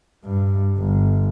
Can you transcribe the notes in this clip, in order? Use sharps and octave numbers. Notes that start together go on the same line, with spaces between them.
G2
G1